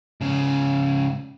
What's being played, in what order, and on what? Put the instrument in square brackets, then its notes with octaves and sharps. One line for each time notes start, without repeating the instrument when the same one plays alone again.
[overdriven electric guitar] G#2 C#3